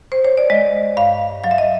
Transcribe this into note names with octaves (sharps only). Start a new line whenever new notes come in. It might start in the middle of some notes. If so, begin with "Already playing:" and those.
C5
C#5
D5
G#3 D#5
G2 F5
F#3 F5
E5
D#5